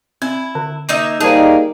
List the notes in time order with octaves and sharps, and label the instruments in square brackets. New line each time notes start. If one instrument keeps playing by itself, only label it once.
[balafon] C4 [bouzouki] E4
[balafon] D3
[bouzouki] A#3 D#4 E5
[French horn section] G3 A#3 D#4 [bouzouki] G#4 [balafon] C5 A5